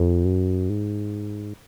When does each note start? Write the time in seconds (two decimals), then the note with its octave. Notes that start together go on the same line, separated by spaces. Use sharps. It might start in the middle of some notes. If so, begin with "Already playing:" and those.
Already playing: F2
0.25 F#2
0.69 G#2